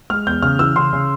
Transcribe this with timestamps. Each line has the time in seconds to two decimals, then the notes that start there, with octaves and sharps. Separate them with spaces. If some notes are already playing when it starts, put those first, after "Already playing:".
0.10 G#3 F6
0.26 E2 G6
0.42 C#3 F6
0.59 E3 E6
0.76 C#3 C6
0.93 C#3